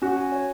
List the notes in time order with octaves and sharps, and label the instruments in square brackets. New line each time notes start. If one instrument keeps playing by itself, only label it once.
[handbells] C#4 [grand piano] F#4
[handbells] G#5
C#5